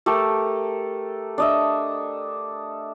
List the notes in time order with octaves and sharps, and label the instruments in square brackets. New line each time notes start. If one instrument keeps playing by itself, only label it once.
[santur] A3 G4 A4 A#4
D4 D#5 E5